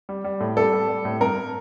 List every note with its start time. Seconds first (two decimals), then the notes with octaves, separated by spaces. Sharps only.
0.09 G3
0.24 G3
0.41 A2
0.57 G3 A4
0.73 G3
0.89 G3
1.05 A2
1.20 G2 A#4